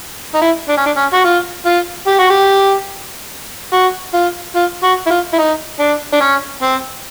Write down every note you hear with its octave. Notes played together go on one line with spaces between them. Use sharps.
D#4
E4
D4
C#4
D4
C#4
F#4
F4
F4
G4
F#4
G4
F#4
F4
F4
F#4
E4
F4
E4
D#4
D4
D4
C#4
C4